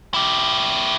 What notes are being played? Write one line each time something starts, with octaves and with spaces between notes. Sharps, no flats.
E4 G4